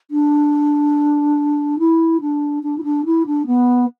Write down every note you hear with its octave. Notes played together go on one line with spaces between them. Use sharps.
D4
E4
D4
D4
E4
D4
E4
D4
B3